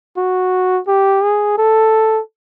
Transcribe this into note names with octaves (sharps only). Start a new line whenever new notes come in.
F#4
G4
G#4
A4